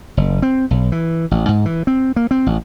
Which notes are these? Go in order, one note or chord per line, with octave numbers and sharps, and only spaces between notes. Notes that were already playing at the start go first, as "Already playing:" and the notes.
F#1
C4
B1
E3
A1
G#2
E3
C4
A#3
C4
A1